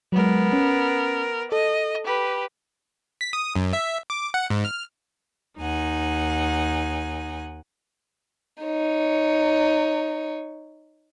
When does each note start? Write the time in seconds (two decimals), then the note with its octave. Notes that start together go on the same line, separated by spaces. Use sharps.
0.12 F#3 G#3 B3 A#4
0.53 C#4
1.52 A4 D#5
2.04 G4 B4
3.21 B6
3.33 D#6
3.56 F#2
3.73 E5
4.10 D6
4.34 F#5
4.50 G#2
4.65 F6
5.59 D#2 D#4 F#5 G#5
8.63 D#4 C#5